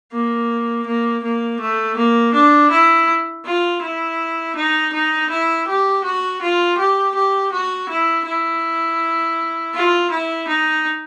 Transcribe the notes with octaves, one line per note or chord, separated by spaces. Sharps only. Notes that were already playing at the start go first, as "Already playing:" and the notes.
A#3
A#3
A#3
A3
A#3
D4
E4
F4
E4
D#4
D#4
E4
G4
F#4
F4
G4
G4
F#4
E4
E4
F4
E4
D#4